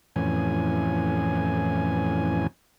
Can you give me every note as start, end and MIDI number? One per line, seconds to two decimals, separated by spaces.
0.16 2.47 41
0.16 2.47 45
0.16 2.47 52
0.16 2.47 61
0.16 2.47 80